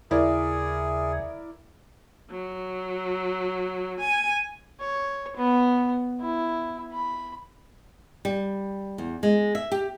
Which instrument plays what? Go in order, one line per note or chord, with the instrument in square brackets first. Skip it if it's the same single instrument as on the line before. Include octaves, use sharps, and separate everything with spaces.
[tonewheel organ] D#2 C#3 [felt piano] E4 A#4 D5 [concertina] G#4
[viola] F#3
G#5
[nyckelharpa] C#5
B3
E4
B5
[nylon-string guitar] G3
E2
G#3
E5
G4